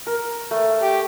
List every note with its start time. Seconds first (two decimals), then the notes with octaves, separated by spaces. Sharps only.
0.07 A#4
0.51 A3
0.82 G4